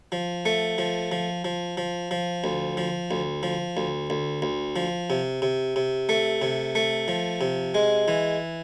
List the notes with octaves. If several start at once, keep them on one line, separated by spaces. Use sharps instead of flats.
F3
A3
F3
F3
F3
F3
F3
D2
F3
D2
F3
D2
D2
D2
F3
C3
C3
C3
A3
C3
A3
F3
C3
G#3
E3